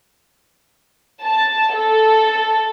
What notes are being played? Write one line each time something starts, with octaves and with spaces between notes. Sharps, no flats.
A5
A4